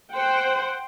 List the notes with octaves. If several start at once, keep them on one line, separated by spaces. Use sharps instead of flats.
C5 F#5 G5